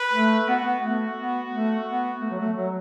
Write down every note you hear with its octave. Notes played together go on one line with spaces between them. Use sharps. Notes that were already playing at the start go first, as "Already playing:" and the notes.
Already playing: B4
A3
B3 F#4
B3
A3
B3
A3
B3
A3
F#3
A3
F#3